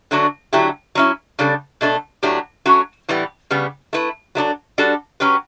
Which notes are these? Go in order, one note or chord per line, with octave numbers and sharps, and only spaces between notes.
D3 F#3 A3 D4 F#4
D3 F#3 A3 E4 G4
F#3 C#4 E4
C#3 G3 D4 A4
B2 A3 D4 A4
A2 F#3 A3 D4 G4
F#3 A3 C#4 F#4
A2 E3 G3 B3
C#3 G3 B3
A3 E4 B4
F#3 A3 D4 A4
G3 D4 F#4 A4
F#3 C#4 G4 B4